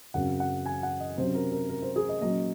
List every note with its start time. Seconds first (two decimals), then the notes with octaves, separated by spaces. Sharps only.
0.14 F#2 C#3 F#3 C4 F#5
0.40 F#5
0.66 G#5
0.83 F#5
1.00 D#5
1.18 C3 F#3 C#4 C5
1.34 A#4
1.52 A#4
1.69 A#4
1.82 C5
1.96 G#4
2.09 D#5
2.21 A#2 F#3 C#4 D#5